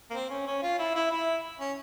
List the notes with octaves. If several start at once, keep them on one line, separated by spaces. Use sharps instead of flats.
A#3
C4
C#4
C#4
F4
E4
E4
E4
C#4